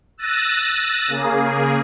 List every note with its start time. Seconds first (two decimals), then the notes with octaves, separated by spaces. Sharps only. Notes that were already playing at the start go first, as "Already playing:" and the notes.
0.18 E6 F#6 A6 A#6 D#7
1.08 C#3 A#3 G#4